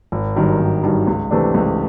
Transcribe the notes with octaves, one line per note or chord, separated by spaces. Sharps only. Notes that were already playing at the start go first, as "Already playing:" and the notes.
G#1
G2 D#3 F#3
G#1
G2 D#3 F#3
C#2
C3 E3 A3 D4
C#2